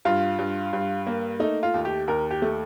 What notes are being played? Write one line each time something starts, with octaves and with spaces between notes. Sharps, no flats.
G2 F4
G2
G2
A#3
A3 D#4
F4
D#2
G4
D#2 A#4
G4
A3